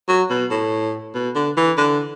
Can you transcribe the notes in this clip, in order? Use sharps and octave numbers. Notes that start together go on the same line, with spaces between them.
F#3
B2
A2
B2
D3
E3
D3